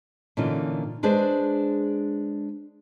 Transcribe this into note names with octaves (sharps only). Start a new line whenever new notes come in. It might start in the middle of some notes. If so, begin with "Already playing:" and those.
A#2 D3 E3 C#4 D#4 F4
G#3 D4 G#4 B4 C5 D5